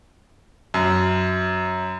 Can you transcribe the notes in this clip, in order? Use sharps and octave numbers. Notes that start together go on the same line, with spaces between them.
F#2